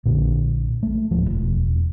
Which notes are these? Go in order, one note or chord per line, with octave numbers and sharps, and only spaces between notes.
A#1 A#2 D3
A3
D1 F3
E1